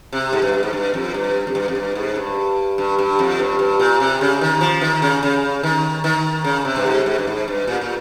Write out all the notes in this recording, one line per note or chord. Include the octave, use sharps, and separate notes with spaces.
C3
G#2
G2
G2
G#2
G2
F2
G2
F2
G2
F2
G2
G#2
G2
G2
G2
F2
G2
G2
A#2
C3
C#3
D#3
F3
D#3
C#3
C#3
D#3
D#3
C#3
C3
G2
G#2
G#2
G2
G#2
G2
A#2
A#2